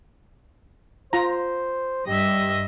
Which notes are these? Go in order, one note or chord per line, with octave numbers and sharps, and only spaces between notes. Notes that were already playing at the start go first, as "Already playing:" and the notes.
F4 C5 A#5
G2 G4 D#5 E5